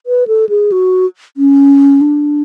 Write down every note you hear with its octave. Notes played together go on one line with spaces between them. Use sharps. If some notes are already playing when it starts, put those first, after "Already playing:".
B4
A4
G#4
F#4
C#4
D4